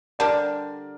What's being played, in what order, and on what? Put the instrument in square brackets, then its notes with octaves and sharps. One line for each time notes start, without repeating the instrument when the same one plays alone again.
[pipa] D3 G3 D4 [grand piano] A#4 D5